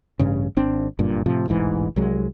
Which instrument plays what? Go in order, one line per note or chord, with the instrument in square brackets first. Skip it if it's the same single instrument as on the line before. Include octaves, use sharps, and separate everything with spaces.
[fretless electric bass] A1 G2 C#3
G#1 C4 D4
F#1 G2 A#2
A2 C3 F3
E1 A1 G#2 E3
C2 F#3 G#3